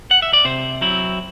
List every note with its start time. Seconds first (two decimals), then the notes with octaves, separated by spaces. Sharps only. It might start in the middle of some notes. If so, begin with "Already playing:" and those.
0.11 F#5
0.22 E5
0.33 D5
0.45 C3 C5
0.81 F#3 C4 E4